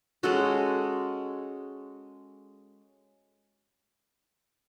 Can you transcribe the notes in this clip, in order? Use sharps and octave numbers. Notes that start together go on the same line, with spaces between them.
G#3 C#4 F#4 A4